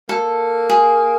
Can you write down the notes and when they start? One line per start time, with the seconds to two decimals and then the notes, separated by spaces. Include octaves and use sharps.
0.09 A#3 A4
0.70 G#4